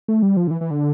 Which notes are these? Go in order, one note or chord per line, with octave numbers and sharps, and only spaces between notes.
A3
G3
F3
D3
E3
E3
D3